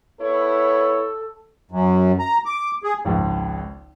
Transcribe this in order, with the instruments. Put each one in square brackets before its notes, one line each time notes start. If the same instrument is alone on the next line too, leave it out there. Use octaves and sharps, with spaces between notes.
[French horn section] B3 E4 C#5 [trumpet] A4
[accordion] F#2
A#5
D6
G#4
[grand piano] G#1 C#2 F3